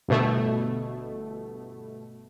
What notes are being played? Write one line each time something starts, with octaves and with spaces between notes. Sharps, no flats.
G1 B2 A3